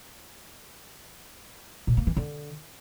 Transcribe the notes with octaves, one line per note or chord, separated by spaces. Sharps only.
A#2
A#3
E3
D3